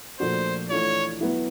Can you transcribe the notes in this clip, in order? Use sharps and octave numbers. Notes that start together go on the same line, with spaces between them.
A#2 F3 A3 D4 F#4 C5
E3 A3 D4 F4 C#5
F#3 B3 E4